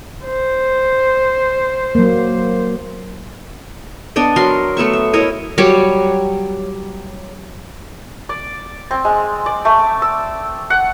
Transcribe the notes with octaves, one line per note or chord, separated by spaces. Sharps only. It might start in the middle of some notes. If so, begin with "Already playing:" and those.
C5
F#3 A#3
B3 D4 D5 D#5
F#3 A#4 C6
A3 B3 E5 C#6
E5
E4 A#4 C#5 D#5
F#3 G3 C#5 D6
D5
C4
G#3
D5
A3
E6
F#5